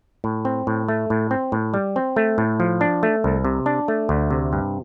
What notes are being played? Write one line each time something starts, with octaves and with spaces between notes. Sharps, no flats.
A2
C4
A2
A3
A2
C4
A2
G3
C4
A3
A2
F3
D4
A3
C2
C3
D4
A3
D2
C3
G2